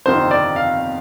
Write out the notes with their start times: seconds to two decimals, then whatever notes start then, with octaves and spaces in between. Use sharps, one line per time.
0.06 G1 F2 C3 D#3 C5
0.31 D5
0.56 F5